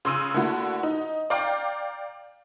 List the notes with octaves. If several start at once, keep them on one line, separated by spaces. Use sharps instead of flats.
C#3 C6 E6 D#7
D3 A3 A#3 E4 F#4
D#4
D5 F5 G5 A#5 D6